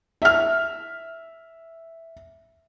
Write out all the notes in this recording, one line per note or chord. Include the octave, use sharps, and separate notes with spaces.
E5 F6